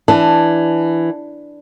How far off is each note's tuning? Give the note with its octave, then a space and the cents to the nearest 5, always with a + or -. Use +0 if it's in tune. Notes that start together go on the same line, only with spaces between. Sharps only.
E3 +10 D4 +0 A5 +0